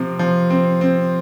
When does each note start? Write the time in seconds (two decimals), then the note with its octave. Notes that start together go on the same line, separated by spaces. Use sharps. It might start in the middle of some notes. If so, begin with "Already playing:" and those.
Already playing: C3 F3 C4
0.19 F3
0.50 C4
0.81 C4